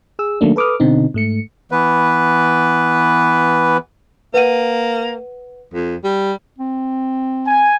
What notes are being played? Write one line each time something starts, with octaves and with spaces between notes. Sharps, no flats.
G#4 E6
D#3 F#3 A3 A#3 D4
A4 B4 D6 D#6 F6
B2 D3 C4 D#4
G#2 A3 C#7
E3 B3 B4
A#3 B4 F#5 D#7
F2
G3
C4
G#5